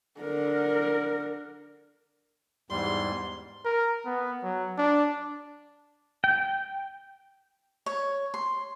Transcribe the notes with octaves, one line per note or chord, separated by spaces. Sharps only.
D3 A#4
E2 G#2 G3 C6
A#4
B3
F#3
D4
G5
C#5
C6